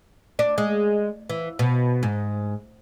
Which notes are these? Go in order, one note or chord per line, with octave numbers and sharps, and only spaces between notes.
D4
G#3
E3
B2
G#2